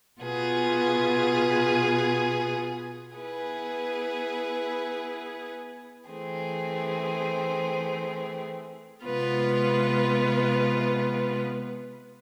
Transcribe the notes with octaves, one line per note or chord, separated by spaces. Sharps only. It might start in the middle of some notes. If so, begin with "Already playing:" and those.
B2 B3 F4 G#4 B4
B3 E4 G#4 B4
E3 A3 C4 G#4
C3 G#3 B3 F4 B4